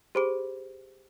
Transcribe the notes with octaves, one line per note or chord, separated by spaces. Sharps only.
G4 G#4 C5 B5 D6 D7